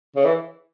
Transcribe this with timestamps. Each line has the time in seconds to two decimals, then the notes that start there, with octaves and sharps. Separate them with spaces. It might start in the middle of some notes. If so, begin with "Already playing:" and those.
0.16 C#3
0.25 E3